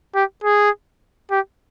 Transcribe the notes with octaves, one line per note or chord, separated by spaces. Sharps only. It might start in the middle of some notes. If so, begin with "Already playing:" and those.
G4
G#4
G4